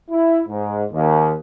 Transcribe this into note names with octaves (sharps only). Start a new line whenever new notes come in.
E4
G#2
D#2